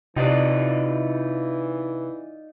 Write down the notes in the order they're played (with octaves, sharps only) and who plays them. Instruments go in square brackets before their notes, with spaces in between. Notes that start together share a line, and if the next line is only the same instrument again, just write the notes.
[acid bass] C3 [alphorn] E3 [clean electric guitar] D#4 F4 D5